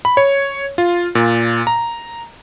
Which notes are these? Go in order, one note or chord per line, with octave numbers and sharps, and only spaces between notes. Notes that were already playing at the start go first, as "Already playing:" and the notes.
B5
C#5
F4
A#2
A#5